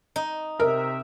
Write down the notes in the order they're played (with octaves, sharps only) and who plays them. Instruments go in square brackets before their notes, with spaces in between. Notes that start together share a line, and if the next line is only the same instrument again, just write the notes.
[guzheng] D#4
[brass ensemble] C3 E5 [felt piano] A#4